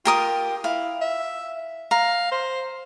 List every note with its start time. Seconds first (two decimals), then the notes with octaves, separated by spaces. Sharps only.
0.05 F4 G4 A#4 D#6
0.64 E4 F5
1.01 E5
1.91 F5 A#5
2.32 C5